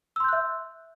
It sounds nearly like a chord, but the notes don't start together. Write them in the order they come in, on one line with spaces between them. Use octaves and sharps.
E6 C6 G6 F#6 E5